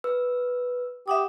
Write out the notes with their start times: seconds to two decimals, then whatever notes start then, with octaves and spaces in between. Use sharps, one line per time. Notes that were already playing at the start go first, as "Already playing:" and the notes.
0.04 B4 E6
1.08 G4 E5 F#5 D#6